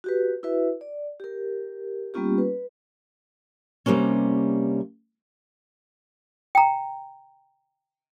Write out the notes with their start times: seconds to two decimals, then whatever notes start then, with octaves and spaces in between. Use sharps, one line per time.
0.04 F#4 G4 B4
0.43 E4 F#4 B4 E5
0.81 D5
1.20 G4 A#4
2.14 G3 A#3 B3 C#4 F4 G4
2.38 B4
3.86 C3 F#3 G3 A#3 C#4
6.55 G5 A#5